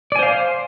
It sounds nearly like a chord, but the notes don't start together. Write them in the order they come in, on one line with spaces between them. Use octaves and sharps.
D5 G#5 C5 F5 C6